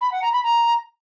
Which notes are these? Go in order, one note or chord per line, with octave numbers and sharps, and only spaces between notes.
B5
F#5
A#5
B5
A#5